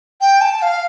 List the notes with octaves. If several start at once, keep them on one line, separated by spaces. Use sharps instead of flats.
G5
A5
F5